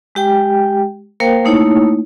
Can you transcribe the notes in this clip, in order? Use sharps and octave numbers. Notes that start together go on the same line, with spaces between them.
G#3 G4 G5
A#3 A#4 C5 F5 G5
A3 A#3 D#4 E4 C#5